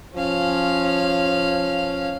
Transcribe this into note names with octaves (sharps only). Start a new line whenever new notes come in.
F3 C#4 F5